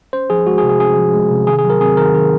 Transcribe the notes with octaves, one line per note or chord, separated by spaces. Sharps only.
C#4 C5
F3 G#4
G#3 F#4
G#4
C3
G#4
C#4 G#4
F3
G#3
C3
D#3 G#4
G#4
F#3
A#4
C4 G#4
D#3 A#4
D#3 G#4